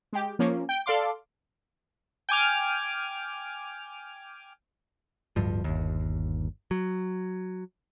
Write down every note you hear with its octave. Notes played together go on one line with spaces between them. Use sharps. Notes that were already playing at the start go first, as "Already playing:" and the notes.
G#3 G4
F3 A#3 C#4
G5
A4 D5 F5 C6 D6
G5 G#5 D6 F6
D1 G2 F3
G1 D#2
F#3